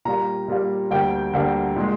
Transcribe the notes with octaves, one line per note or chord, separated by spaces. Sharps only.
A#2 G3 A#3 A#5
A#2 G3 A#3
D2 D3 G3 A#3 G5
D2 D3 G3 A#3
A#2 G#3